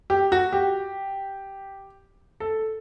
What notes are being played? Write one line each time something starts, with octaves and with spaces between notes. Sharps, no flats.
G4
F#4
G4
A4